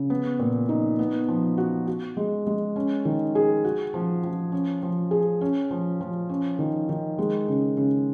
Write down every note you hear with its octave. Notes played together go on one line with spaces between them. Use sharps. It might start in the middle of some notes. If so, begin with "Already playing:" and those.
Already playing: C#3
B3
A#2
D#4
B3
F3
F#4
F#4
G#3
G#3
C#4
D#3
G#4
F#4
F3
F3
C#4
F3
G#4
C#4
F3
F3
C#4
D#3
D#3
G#3
C#3
C#3